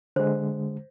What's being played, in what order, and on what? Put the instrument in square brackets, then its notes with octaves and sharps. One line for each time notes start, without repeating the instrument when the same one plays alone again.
[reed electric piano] D3 G#3 [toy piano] C5